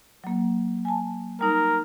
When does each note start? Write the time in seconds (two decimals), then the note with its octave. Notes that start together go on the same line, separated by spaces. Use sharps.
0.24 F#3 A#3
0.85 G#5 A5
1.41 G3 D#4 A#4